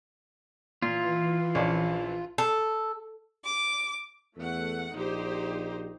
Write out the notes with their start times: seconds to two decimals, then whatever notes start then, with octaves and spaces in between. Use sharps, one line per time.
0.82 A#2 E3 F4
1.55 A#1 C#4 D5
2.38 A4
3.45 D6
4.37 E2 A3 F#5
4.95 A#1 D#4 G4 C5